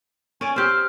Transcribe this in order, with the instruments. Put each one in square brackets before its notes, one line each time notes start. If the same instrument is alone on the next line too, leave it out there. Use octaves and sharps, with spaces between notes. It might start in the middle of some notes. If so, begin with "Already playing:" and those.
[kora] C#4 D5 [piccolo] G#5
[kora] C4 G4 [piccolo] F6